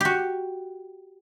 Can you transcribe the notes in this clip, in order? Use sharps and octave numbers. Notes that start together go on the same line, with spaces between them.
F#4 G4